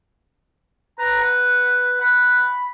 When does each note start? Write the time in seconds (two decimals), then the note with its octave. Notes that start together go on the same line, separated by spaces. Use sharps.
0.99 B4 A#5
1.20 F#5
2.00 F#5 B5